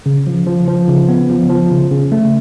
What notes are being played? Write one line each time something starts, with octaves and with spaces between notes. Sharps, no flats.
C#3
F3
F3
F3
C#3
B3
F3
F3
C#3
C#3
A3